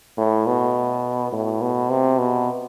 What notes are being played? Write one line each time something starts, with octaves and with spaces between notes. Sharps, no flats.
A2
B2
A2
B2
C3
B2